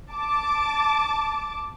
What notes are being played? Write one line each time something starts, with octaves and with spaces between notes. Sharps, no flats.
A5 D6